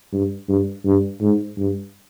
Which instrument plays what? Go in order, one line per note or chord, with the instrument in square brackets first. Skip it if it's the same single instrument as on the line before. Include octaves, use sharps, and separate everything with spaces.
[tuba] G2
G2
G2
G#2
G2